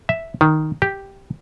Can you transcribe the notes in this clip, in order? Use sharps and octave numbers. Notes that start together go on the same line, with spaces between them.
E5
D#3
G4